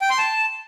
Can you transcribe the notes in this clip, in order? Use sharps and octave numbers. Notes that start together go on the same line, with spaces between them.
G5
C6
A5